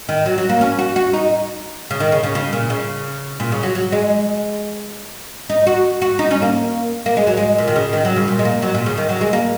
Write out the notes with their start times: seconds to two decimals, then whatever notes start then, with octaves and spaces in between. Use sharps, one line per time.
0.09 D#3
0.26 F#3
0.38 F#3
0.49 A#3
0.61 C#4
0.79 F#4
0.96 F#4
1.13 D#4
1.91 C#3
2.00 D#3
2.12 C#3
2.23 C#3
2.35 C#3
2.53 A#2
2.70 C#3
3.40 A#2
3.52 C#3
3.63 F#3
3.75 F#3
3.92 G#3
5.50 D#4
5.67 F#4
6.02 F#4
6.19 D#4
6.31 C#4
6.42 A#3
7.06 A#3
7.17 G#3
7.27 F#3
7.37 G#3
7.58 A#2
7.68 D#3
7.76 C#3
7.93 D#3
8.05 F#3
8.16 C#3
8.28 A#2
8.39 G#3
8.45 A#3
8.62 F#3
8.75 A#2
8.86 C#3
8.98 D#3
9.09 F#3
9.21 G#3
9.33 A#3